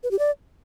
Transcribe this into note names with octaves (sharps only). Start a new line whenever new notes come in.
B4
G4
D5